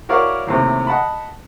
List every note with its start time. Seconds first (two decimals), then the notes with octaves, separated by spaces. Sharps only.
0.09 E4 F#4 A#4 C#5 D5 F5
0.47 D#2 A2 C3
0.87 D#5 F#5 A5 B5